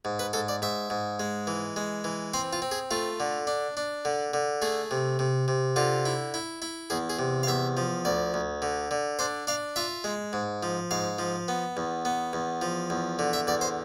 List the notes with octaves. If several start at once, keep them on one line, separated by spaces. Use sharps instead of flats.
G#2
B4
G#2 A4
D5
G#2 E5
G#2
G#3
E3
G#3
E3
C4 C5
F4
C4
G#4
A3 F4
D3
D4
D4
D3
D3
A3 G#4
C3
C3
C3
D3 F4
E4
E4
E4
E2 G#4
G#4
C3
F5
E2 E5
F3
D2 D5
D2
D3
D3
D4 C5
D4 F5
F4 E5
G#3
G#2
F3
G#2 F5
F3
B3
E2
B3
E2
F3
E2
D3
E5
E2 D5
C5